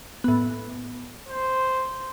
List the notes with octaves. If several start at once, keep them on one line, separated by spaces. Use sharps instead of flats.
A2 B3
C5